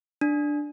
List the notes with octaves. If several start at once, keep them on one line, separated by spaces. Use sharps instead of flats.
D4